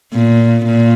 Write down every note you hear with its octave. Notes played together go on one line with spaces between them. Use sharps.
A#2
A#2